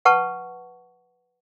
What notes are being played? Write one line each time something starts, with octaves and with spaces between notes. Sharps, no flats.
B4 F#5 A5 C#6